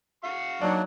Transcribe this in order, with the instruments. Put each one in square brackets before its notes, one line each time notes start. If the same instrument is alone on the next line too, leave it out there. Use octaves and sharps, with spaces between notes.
[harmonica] F#4 F5 C#6
[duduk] F#3 [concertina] A#3 D4 [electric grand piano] D#4 D5